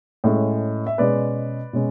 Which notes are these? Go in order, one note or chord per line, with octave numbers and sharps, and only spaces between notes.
A2 G#3 C#4
E5
B2 G#3 C#4 B4 D5
B2 G#3 C#4